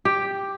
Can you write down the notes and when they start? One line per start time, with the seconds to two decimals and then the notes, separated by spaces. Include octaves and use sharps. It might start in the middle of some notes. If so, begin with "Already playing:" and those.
0.05 G4